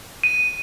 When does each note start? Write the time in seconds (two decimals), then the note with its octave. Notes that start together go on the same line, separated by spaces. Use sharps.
0.24 D#7